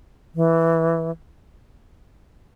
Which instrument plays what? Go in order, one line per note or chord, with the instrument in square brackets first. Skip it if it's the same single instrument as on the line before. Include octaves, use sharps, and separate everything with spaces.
[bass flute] E3